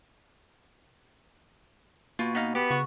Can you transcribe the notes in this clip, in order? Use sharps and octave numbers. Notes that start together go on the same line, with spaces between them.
B2 A#3 F4
B3 D#4 F5
B3 G4
C#3 F#4